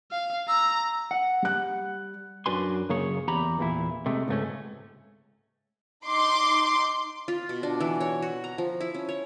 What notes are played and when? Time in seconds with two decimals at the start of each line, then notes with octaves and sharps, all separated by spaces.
0.12 F5
0.48 A#5 E6
1.11 F#5
1.42 G3 F#6
2.46 F#2 D4 F#4 B4 G#5 C6
2.89 F#2 C#3 A#3 G#4 C#5
3.28 E2 G4 A#5 B5
3.59 E2 A#2 E4
4.06 C3 G#3 A3
4.28 C#2 G#2 A3 C#4
6.07 D#4 C6 D6
7.28 F4
7.49 B2
7.63 D4
7.80 E3
8.00 C#5
8.22 F#4
8.44 A#5
8.58 F3
8.80 E4
8.94 C#4
9.09 C#5